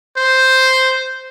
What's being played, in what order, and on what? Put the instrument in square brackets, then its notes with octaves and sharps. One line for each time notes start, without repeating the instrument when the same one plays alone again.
[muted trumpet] C5